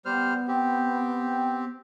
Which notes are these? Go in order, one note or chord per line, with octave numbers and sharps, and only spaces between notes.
G3 B3 C5 F6
C4 G4